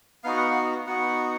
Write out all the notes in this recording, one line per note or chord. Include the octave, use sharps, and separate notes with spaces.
B3 D#4 F#4 F5
F#5
F5
B3 D#4 F#4 F#5